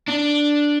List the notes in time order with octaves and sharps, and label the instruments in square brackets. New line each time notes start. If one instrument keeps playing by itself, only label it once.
[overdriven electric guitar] D4